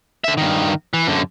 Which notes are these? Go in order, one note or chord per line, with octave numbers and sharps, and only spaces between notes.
D3 E5
G2 D#3
E3
F#2 D3